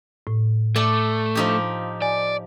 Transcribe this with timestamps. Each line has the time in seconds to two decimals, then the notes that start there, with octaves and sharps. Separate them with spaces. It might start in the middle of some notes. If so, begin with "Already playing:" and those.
0.27 A2
0.76 A3 D5 A5
1.35 F3 D#4 G4
2.02 D5 G#5